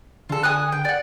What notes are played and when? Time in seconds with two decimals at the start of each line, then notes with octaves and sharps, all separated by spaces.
0.29 D3 F4 A4
0.43 G#5 D#6 F#6
0.72 G5
0.85 D5 F#5